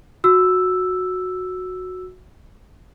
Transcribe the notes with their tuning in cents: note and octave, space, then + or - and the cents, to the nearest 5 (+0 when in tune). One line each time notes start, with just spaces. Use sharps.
F#4 -10 E6 +0